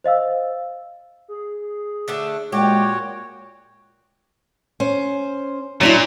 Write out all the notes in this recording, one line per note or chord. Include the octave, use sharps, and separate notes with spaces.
C5 D#5 F5 E6
G#4
D3 A3 D4
A#2 G#3 F#4 G4 C#5
C#4 C5
A#2 F#3 D4 E4